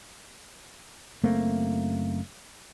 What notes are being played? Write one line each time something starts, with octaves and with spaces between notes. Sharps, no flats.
F#1 A3 A#3 C4